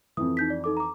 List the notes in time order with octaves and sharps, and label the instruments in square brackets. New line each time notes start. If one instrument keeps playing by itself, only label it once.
[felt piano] F2 E3 [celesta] D#6
[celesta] D#4 G6 B6
D5
D#4 A4 D6
A#5 D6